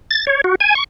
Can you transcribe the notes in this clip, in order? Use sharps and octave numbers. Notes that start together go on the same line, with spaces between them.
A6
C#5
F#4
G#5
C#6